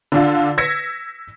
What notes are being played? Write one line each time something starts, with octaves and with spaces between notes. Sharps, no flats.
D3 D4 F4
E6 G#6 A#6 B6 C#7